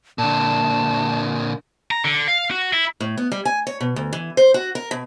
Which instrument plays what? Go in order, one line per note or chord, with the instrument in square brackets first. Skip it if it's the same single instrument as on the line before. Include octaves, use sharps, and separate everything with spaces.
[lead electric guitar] A#2 D3 [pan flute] A5
[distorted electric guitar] A#5
D3
F5
F#4
E4
[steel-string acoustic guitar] A2
B3
G3
G#5
C#5
B2
D2
E3
C5
F#4
A#4
B2